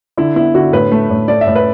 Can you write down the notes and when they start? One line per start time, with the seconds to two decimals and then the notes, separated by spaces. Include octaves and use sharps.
0.17 D3 E4
0.36 B3 E4
0.54 D3 F#4
0.73 A2 B4
0.92 A3
1.10 A2
1.28 A3 D5
1.41 E5
1.47 A2
1.55 B4